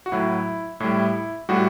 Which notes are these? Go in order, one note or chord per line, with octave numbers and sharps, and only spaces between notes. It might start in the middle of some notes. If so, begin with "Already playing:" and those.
F#4
A2 F#3 E4
A2 G3 E4
A2 G3 F#4